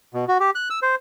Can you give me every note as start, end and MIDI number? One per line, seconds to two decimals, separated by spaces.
0.14 0.25 47
0.28 0.38 66
0.40 0.50 67
0.55 0.69 90
0.70 0.79 88
0.82 0.95 72